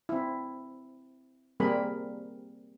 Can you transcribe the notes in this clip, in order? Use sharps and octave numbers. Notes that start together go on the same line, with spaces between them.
C4 E4
G3 A#3 C4 G#4 A#4 B5